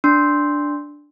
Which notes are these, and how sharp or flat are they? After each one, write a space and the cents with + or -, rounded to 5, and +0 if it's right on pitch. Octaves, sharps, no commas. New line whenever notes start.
D4 +0 C6 +0